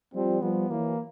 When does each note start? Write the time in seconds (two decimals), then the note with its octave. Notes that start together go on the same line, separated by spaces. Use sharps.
0.13 F3 G3 C4
0.42 F3 G3 B3
0.70 E3 F#3 A#3